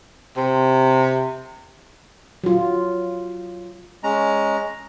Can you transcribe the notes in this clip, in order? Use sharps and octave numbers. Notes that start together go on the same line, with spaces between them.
C3
F#3 F4
G#3 C#4 A#5